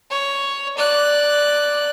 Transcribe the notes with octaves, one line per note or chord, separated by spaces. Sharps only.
C#5
D5 F#6